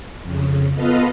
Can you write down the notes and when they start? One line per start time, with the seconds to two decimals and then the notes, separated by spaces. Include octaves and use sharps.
0.22 F2 C#3
0.74 B3 F4 A4 B4 D#5 F5